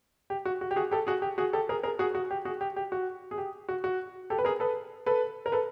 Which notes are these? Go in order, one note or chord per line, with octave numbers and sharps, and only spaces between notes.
G4
F#4
F#4
G4
F#4 G#4
G4 A4
F#4 G#4
G4
F#4 G#4
G4 A4
G#4 A#4
G#4 A#4
F#4 G#4
F#4
G4
F#4 G#4
G4
G4
F#4
G#4
G4
F#4
F#4
G4 A4
B4
G#4 A#4
A4 B4
A4 B4
A#4
A4 B4